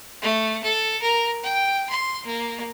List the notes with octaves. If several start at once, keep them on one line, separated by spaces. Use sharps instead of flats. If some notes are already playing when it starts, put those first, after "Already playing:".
A3
A4
A#4
G5
C6
A#3